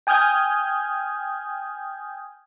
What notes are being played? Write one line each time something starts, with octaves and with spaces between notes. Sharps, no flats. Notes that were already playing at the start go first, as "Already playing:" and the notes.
G5 G#5 D#6 F6 G6 G#6